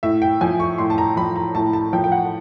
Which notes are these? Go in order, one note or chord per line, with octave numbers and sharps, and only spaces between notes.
A2 E5
G5
F3 G#5
C#6
A2 C6
A5
A#5
F3 B5
A#5
A2 A5
A5
F3 G5
G5
F#5